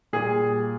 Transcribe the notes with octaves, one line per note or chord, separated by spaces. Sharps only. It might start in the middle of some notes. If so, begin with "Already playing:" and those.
A#2 G3 G#4